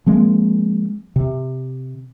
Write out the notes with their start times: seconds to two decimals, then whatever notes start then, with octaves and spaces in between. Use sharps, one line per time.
0.06 F3 G#3 A#3 C4
1.16 C3